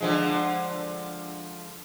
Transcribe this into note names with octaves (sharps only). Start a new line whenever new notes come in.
D3 F3 G#3